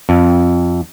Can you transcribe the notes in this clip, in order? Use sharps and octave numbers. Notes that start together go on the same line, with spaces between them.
F2